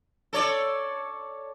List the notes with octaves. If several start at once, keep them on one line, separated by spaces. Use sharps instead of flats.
A4 C#5 D5